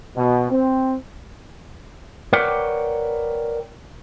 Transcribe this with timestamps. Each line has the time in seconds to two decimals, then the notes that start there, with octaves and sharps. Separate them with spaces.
0.16 B2
0.50 C4
2.33 A#4 B4 C#5 D5 F#5 G5